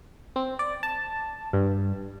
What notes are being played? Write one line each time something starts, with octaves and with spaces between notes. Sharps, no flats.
C4
D5
A5
G2